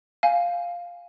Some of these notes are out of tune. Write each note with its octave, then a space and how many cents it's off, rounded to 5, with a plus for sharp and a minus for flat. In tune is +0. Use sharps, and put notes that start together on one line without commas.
F5 +0 G#5 +0